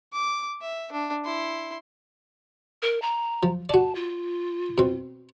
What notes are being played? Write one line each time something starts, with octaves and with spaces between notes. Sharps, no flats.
D6
E5
D4
E4 C6
A#4
A#5
F3
F#4 D5 A5
F4
B2 C4